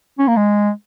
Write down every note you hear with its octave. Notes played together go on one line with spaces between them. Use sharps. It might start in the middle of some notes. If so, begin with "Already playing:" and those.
C#4
A#3
G#3